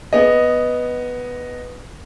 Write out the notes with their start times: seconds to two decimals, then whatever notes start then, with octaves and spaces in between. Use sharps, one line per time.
0.13 B3 D#5